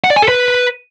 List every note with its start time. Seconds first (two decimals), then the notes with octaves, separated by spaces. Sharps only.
0.04 F#5
0.10 D5
0.16 G#5
0.22 A4
0.28 B4